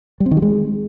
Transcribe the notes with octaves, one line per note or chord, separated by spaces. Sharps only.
G3
C4
D#3
G3
G#3